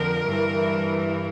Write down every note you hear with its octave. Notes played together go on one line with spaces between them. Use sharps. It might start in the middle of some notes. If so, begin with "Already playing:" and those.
Already playing: F2 D3 F3 A#4
G2 E3